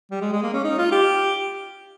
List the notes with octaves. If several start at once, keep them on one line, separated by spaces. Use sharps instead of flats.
G3
G#3
G#3
A#3
C#4
D#4
F4
G4